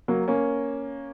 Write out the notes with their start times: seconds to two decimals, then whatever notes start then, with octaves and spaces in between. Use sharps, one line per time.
0.08 F#3 A#3
0.28 A#3 C#4